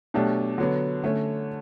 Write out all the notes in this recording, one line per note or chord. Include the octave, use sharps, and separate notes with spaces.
B2 F#3 A3 D4 G4
D3 F#3 B3
D3 A3 C#4